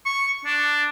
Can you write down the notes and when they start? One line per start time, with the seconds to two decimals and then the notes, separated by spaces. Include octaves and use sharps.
0.06 C#6
0.45 D4